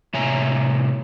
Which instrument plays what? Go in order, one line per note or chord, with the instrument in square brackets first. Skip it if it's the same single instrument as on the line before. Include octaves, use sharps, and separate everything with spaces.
[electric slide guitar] A2 C3 C#5 E5 G#5 A#5